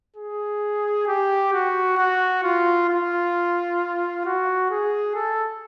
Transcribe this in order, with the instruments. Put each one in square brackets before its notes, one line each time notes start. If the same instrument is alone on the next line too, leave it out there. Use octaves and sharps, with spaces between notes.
[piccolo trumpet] G#4
G4
F#4
F#4
F4
F4
F#4
G#4
A4